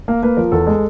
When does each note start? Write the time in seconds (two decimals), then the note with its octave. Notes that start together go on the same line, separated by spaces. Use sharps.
0.08 A#3
0.23 A#3 B4
0.37 F3 A#4
0.52 E2 A4
0.67 G#3